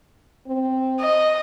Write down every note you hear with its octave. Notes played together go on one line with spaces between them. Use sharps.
C4
D#5